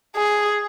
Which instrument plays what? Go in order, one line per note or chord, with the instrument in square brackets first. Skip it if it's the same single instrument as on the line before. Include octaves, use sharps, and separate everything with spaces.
[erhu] G#4